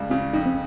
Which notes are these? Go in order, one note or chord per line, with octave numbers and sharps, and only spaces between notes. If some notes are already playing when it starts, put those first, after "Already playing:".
Already playing: C#2 C#3 G3
C#3 C4
F2 D#4
C4